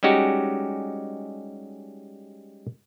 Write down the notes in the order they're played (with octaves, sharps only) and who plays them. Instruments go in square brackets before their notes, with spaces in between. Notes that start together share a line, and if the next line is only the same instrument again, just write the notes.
[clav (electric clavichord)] G3 G#3 C#4 D#4 F#4 G4